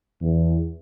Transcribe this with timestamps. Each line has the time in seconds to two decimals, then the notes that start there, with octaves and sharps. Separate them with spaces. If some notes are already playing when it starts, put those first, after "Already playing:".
0.22 E2